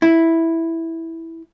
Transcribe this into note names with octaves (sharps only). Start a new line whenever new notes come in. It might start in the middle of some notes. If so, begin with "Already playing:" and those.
E4